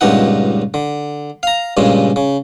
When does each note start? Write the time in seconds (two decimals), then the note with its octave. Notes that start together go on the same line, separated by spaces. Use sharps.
0.01 C#2 G2 A#2 D#4 F#5
0.74 D3
1.43 F5 A#5
1.77 G2 A#2 C#3 G#3
2.16 C#3